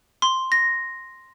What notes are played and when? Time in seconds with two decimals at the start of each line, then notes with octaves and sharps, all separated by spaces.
0.22 C6
0.52 A#6